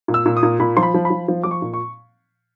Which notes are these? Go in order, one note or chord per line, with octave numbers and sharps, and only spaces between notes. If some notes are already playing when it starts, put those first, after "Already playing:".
A#2
E6
A#2
D#6
A#2
A#2 B5
F3 C6
B5
F3
B5
F3
F3
F3 D6
C#6
A#2
C#6